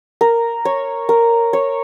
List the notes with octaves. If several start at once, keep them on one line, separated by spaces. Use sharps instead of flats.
A#4
C#5
A#4
C#5